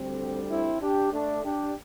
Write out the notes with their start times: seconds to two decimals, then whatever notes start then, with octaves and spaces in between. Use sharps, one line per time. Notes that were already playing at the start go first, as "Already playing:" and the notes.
Already playing: D2 D3 G3 C4
0.49 C4 E4
0.81 D4 G4
1.13 A3 D4
1.44 D4 G4